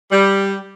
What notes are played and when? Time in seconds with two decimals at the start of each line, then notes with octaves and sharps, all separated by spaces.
0.12 G3